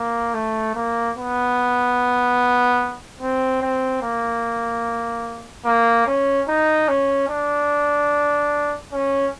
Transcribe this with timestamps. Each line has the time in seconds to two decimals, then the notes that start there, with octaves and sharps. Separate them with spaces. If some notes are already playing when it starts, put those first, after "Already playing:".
Already playing: A#3
0.34 A3
0.75 A#3
1.17 B3
3.21 C4
3.62 C4
4.02 A#3
5.65 A#3
6.06 C#4
6.48 D#4
6.88 C#4
7.29 D4
8.92 C#4